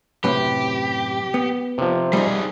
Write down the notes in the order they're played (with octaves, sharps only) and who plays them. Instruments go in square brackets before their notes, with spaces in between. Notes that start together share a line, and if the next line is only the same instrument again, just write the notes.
[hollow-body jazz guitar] F#2 A2 C3 [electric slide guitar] G4 [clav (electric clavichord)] B4
[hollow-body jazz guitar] B3
[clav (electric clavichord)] C3 F3
[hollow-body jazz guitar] G3 D#4 [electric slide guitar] A#3 G#4